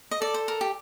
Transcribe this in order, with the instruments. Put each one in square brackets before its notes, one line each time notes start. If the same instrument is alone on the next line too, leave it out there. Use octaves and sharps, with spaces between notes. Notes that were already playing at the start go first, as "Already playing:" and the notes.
[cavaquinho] D#5
[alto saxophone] A4 [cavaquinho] D5
[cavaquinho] C5
A#4
G4